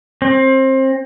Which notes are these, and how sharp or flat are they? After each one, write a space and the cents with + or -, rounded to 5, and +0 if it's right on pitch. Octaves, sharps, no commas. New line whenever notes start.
C4 +25